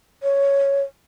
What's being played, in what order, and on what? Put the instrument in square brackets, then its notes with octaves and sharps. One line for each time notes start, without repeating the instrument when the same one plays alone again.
[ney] C#5